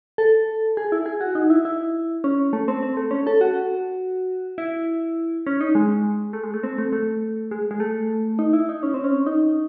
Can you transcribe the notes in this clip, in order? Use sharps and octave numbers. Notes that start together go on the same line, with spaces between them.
A4
G#4
E4
G#4
F#4
D#4
E4
E4
C#4
A3
C4
C4
A3
C#4
A4
F#4
E4
C#4
D#4
G#3
A3
G#3
A3
C4
A3
A3
G#3
G#3
A3
D#4
E4
D#4
C#4
C4
C#4
D#4